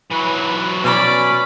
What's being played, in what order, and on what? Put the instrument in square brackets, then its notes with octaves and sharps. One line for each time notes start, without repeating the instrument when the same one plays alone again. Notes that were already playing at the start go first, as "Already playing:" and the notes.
[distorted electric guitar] E3 F#3 [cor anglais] B4
[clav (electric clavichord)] B2 [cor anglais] C#4 [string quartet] D5 B5 D6